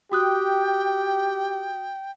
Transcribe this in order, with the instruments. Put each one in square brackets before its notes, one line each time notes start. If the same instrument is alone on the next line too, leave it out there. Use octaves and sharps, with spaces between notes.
[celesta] F#4 D#6 F#6 [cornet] G4 [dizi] G5